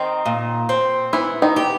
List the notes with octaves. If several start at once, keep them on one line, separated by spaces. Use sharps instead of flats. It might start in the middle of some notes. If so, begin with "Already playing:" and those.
Already playing: D#3 C4 D#4
A#2
C4
E3 B3 E4
D#3 D#4
G4